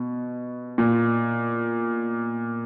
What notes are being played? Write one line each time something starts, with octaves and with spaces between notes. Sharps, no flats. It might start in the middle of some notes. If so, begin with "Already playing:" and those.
Already playing: B2
A#2